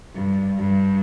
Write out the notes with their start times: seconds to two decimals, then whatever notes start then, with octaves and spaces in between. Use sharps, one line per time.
0.15 G2
0.59 G2